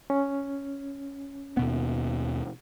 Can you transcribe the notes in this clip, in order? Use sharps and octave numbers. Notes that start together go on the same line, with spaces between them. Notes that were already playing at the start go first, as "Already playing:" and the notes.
C#4
D#2 B2 B3